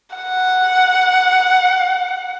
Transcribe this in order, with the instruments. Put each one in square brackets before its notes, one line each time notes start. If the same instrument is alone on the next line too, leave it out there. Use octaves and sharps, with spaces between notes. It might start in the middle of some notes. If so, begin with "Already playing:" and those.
[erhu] F#5